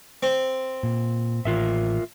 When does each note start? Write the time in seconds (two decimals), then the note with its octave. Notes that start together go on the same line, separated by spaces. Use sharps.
0.23 C4
0.83 A#2
1.45 A1 F4 A#4 E5